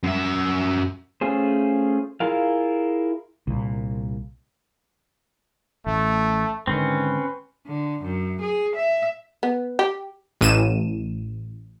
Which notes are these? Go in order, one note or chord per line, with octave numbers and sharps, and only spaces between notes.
F#2 E5
A3 C#4 F4 G#4 C5
E4 F4 G#4 A#4 F5
C2 A#2
A1 A3
G#2 D3 D#3 C4 C#4 B4
D3
F#2
G#4
E5
B3
G4
A1 D#7 E7